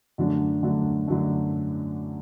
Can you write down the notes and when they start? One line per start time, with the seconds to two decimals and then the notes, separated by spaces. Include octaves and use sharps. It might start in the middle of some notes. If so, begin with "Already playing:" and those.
0.18 F#2 D3 F#3 A3 D4
0.63 F#2 D3 F#3 A3 D4
1.07 F#2 D3 F#3 A3 D4